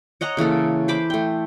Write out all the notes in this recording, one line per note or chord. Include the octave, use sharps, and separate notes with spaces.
C#5 D#5 F#5 A#5
C#3 E3 A#3 A4
C5 B5 D6
A3 G5